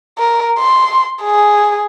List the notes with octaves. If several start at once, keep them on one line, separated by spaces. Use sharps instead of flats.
A#4
C6
G#4